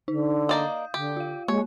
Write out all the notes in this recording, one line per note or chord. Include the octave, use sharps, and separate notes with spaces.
D3 D#4
A#3 D5 D#5 F5 D#6 G6
D3 G4
F4 F5
G#3 A#3 C#5